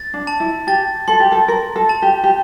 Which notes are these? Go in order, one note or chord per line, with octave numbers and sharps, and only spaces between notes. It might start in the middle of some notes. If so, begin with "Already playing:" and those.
Already playing: A6
D4
A5
E4
G4 A6
A4 C6
G4
A4
A#4 C6
A4
A5
G4
G4